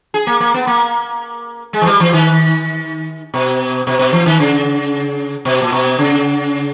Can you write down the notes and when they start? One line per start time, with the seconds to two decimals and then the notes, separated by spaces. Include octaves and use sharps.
0.14 G#4
0.27 A#3
0.40 A#3
0.54 B3
0.67 A#3
1.73 G#3
1.81 E3
1.86 G3
2.00 E3
2.13 D#3
3.34 B2
3.87 B2
3.99 B2
4.13 E3
4.26 D#3
4.40 C#3
5.45 B2
5.62 A#2
5.72 B2
5.99 C#3